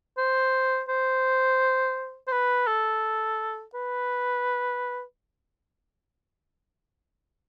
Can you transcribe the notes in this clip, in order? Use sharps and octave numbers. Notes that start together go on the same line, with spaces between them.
C5
C5
C5
B4
A4
B4